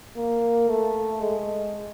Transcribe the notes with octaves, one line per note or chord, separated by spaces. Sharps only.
A#3
A3
G#3